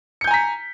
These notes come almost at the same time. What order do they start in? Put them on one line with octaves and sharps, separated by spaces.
C#7 G6 G#5 A#5 B6